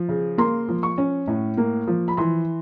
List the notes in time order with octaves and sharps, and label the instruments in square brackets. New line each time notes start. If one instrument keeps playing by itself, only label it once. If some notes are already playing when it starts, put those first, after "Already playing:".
Already playing: [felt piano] F3
C#3
A#3 C6
F3
C#6
C#4
A2
A#3
F3
B5
E3 C6